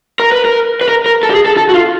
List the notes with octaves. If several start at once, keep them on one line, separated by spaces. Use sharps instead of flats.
A#4
B4
A#4
B4
A#4
A#4
A4
G4
G#4
A4
A4
F#4
F4